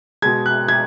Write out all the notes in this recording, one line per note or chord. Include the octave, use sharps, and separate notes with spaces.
B2 G#3 G#6
F#6
G#6